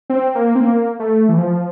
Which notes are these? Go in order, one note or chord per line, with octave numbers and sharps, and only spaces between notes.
C4
A#3
C4
A#3
A3
E3
F3